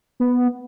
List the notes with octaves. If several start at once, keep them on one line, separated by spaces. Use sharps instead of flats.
B3